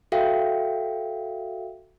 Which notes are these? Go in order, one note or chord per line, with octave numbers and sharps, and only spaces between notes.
F#4 A4 E5 F5 G5